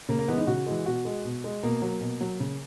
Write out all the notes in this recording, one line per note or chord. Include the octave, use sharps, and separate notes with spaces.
C#3 A#3
A#3
E3 G#3 B3
D#4
C#3 F#4
E3 G#3
B2 F#4
G#3
B2
G#3
B2 A#3
F#3
B2
F#3
C#3